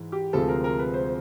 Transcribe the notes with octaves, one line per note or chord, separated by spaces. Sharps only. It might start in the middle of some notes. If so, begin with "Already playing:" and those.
Already playing: G#2 E3 G#3
G4
D2 C3 F3 G#3 A4
A#4
A#4
B4
C5